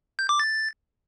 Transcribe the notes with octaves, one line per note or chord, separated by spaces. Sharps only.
G6
D6
A6